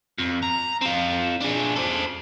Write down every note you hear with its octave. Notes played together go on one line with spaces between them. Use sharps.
F2
A#5
C4 F4
D4 G#4
A4 C5